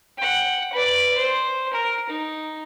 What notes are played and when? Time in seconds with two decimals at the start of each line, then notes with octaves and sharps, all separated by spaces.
0.17 F#5 G5
0.73 B4 D5
1.18 C5
1.73 A#4
2.10 D#4